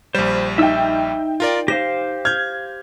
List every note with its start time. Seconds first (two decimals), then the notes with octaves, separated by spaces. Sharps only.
0.15 A#1 G3 C5
0.58 D#4 E5 G5 E6
1.40 F4 A#4 D5
1.68 G4 C5 F5 A#6
2.25 F6 G6 G#6